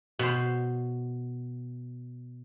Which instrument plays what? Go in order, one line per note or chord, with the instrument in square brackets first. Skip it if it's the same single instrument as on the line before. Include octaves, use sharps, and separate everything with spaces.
[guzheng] B2 C5